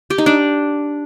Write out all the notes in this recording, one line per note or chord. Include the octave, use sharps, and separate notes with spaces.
G4
D#4
D4